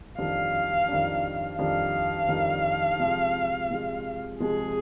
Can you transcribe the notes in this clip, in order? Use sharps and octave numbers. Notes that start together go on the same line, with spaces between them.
F2 D#3 G3 D4 F5
F2 D#3 G3 D4
F2 D#3 G3 D4 F5
F2 D#3 G3 D4
C3 F3 G#3
C3 F3 G#3
C3 F3 G#3 G#4